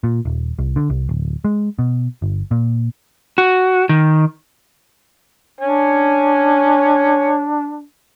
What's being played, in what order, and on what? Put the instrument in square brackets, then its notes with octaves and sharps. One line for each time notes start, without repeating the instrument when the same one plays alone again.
[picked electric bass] A#2
D#1
C2
D3
C2
D1
G#3
B2
G1
A#2
[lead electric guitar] F#4
D#3
[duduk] D4 [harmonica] C#5 G#5